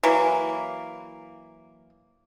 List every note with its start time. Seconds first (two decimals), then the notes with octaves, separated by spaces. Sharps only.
0.03 E3 F#3 A#3